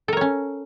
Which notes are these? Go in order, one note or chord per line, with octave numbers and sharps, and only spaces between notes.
C#4 A4 A#4 C#5